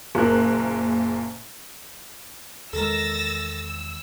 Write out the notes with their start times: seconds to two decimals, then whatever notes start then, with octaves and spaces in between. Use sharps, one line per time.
0.15 F#1 A#2 A#4 F#6
2.73 E2 D#3 G#3 A4 A#4 E6 A6 A#6